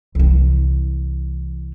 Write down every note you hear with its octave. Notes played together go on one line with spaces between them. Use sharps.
C2 E3